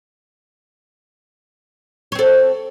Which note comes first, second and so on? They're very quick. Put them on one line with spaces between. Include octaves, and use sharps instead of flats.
C#5 C4 A4